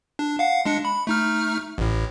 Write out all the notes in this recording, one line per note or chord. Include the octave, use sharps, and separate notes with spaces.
D4
F5 F#5
G#3 D4 C#7
B5
A3 D#4 F6
A1 A2